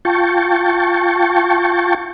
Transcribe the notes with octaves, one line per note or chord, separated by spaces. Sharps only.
F4 G5 A5 C#6